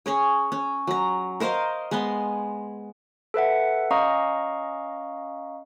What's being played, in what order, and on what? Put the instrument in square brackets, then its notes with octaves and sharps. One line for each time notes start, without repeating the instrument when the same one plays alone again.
[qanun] C#4 G#4 C#5
C#4
F#3 A#5
A#4 C5 D#5 F5
G#3 B3 G#5 C6
[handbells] A4 B4 E5 F#5
C#4 D#5 F5 A#5 C#6 D#6